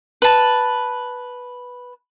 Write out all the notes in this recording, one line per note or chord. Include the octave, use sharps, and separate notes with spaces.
B4 A5